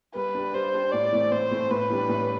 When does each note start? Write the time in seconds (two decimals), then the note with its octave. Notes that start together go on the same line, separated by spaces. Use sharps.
0.15 G3 B4
0.35 D4 G4
0.53 G3 C5
0.74 D4 G4
0.92 A2 D5
1.13 E3 A3 C4
1.32 A2 C5
1.51 E3 A3 C4
1.71 A2 B4
1.90 E3 G3 D4 G4
2.09 A2